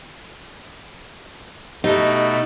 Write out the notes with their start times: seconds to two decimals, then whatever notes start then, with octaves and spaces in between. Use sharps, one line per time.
1.84 B2 A3 D#4 G4